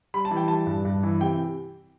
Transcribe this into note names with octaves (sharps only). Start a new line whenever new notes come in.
G3 B5
A5
E3
G5
G3 A5
G2
G2
E3
C3 G5